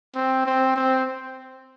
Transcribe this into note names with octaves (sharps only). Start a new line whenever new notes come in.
C4
C4
C4